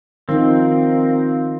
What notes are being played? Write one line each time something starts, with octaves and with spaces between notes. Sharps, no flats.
D#3 F3 A#3 C4 D#4